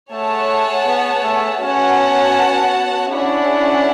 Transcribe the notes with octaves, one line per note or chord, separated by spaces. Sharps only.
A3 G#4 C#5 F#5 A5
B3
A3
B3 C#4 F#4 C#5 F#5 A5
C#4 D4 E4 G#4 C#5 F#5